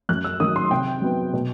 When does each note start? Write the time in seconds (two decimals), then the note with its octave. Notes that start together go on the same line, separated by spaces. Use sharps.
0.09 F#2 F#6
0.24 E6
0.40 D#3 F#3 D#6
0.56 C6
0.71 C3 G5
1.02 F#3 B3
1.33 B2